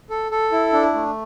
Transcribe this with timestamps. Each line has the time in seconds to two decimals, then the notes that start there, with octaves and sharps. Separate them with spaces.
0.10 A4
0.31 A4
0.52 E4
0.73 D4
0.94 A3